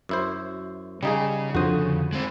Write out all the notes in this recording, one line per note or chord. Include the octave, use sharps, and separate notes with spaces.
F#2 E4 C5
C#3 G3 D#4 G#4
F2 D3 F#4 C5 D#6
G#3 C4